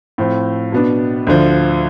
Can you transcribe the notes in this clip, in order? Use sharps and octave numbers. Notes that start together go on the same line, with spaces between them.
A2 F3 C4
B2 B3 D4
D2 D3 F3